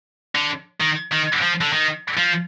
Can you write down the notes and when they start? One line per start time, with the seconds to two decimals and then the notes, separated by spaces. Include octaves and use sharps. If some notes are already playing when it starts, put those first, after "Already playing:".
0.35 D3
0.81 D#3
1.12 D#3
1.42 F3
1.61 D3
1.73 D#3
2.17 F3